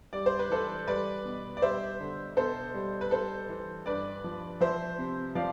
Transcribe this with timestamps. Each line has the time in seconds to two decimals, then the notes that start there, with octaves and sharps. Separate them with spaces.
0.13 G3 D5
0.26 C5
0.39 B4
0.50 E3 A4 C5
0.87 G3 B4 D5
1.25 B2
1.57 D5
1.62 G3 C5 E5
2.00 D3
2.37 B2 A4 C5
2.74 G3
3.01 B4
3.11 G3 A4 C5
3.49 E3
3.86 G2 B4 D5
4.24 F3
4.61 F3 C5 E5
4.98 C3
5.35 F3 D5 F5